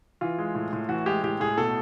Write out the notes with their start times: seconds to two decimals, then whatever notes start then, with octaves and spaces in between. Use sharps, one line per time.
0.21 E3 F4
0.38 G#3
0.55 A2
0.73 A2
0.89 E3 F#4
1.06 G#3 G4
1.23 A2 G4
1.40 A2 G#4
1.57 B2 A4